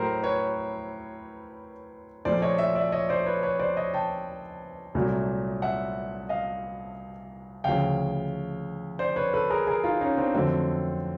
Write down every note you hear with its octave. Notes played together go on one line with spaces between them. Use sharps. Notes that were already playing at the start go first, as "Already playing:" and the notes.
Already playing: A2 F#3 A3 A#4 C5
B4 C#5
A#2 F3 A3 C5 D5
C#5 D#5
D5 E5
D5 E5
C#5 D#5
C5 D5
B4 C#5
B4 C#5
C5 D5
C#5 D#5
G5 A5
C2 A#2 F#3 A3
E5 F#5
D#5 F5
D2 C#3 F3 F5 G5
C5 D5
B4 C#5
A4 B4
G#4 A#4
G#4 A#4
D#4 F4
C#4 D#4
C4 D4
F2 D3 F#3 A3 C4